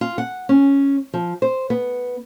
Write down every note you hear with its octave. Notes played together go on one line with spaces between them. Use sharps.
F4
F#5
C#4
F3
C5
B3